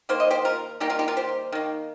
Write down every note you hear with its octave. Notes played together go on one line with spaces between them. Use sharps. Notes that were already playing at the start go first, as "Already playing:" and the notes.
D#3 A#3 C5
D#5
G4 C5
F4 A#4
D#3 G3 A#3 D#4 G4
F4 A#4
D#4 G4
F4 A#4
G4 C5
D#3 A#3